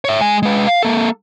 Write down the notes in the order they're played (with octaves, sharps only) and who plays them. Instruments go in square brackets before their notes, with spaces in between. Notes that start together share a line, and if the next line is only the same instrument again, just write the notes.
[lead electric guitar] C#5 E5
G#3 G#5
G#3 B4
F5
A#3 A4